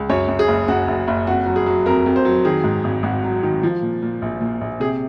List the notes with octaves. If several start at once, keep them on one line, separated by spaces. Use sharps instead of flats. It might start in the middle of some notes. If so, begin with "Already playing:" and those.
Already playing: C#2
F#2 C#5
F#2
G#4
F#1
F#2 F#4
F#1
F#1
F2 F#4
F#3
G#4
F#3
F2 A#4
F2
C5
F#3
D#3 G#4
G#2
G#1
G#1 F#4
F#3
D#3
F3
A#2
A#2
A#1
A#2
A#1
C3 G#4